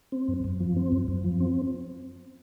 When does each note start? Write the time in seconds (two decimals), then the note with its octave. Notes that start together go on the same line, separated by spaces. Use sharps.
0.12 C4
0.28 F#2
0.44 F#2
0.60 F3
0.76 C4
0.92 F#2
1.08 F#2
1.24 F3
1.40 C4